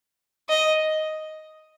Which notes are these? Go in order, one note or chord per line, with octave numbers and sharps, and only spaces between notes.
D#5